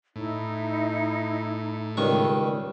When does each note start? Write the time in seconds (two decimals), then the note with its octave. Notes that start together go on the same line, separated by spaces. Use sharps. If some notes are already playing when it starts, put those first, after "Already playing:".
0.16 A2 D#4 E4
1.97 C#2 D#3 G3 C#6